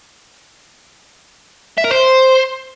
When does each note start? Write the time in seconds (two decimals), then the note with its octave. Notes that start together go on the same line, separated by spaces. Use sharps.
1.78 E5
1.84 A#4
1.91 C5